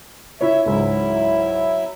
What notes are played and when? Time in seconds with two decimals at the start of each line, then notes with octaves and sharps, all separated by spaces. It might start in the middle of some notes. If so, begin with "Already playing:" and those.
0.41 E4 C#5 E5
0.66 C#2 G#2 F#3 E4 E5